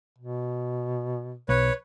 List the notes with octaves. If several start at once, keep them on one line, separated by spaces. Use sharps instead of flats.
B2
B1 B4 C#5